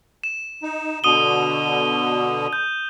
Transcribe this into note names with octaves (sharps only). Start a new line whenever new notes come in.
E7
D#4
B2 D3 D#6 D#7 G7
G6